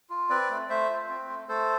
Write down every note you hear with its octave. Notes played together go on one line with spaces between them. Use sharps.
F4
C4 B4 D5
A3
A3 C5 E5
F4
C4
A3
A3 A4 C5